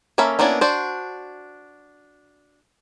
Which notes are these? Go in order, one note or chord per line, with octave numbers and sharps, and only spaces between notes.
A#3 C#4 A4 E5 B5
A#3 B3 C#4 D4 E4
D4 F#4 C5